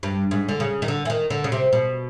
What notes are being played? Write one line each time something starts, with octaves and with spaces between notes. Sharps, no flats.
G2
G#2
D3
C#3
D#3
D3
E3
D#3
D3
C#3
C3
B2